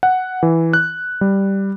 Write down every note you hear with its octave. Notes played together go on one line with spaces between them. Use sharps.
F#5
E3
F#6
G3